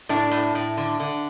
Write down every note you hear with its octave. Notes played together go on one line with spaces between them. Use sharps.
A2 D4
A2
A2
D3
D3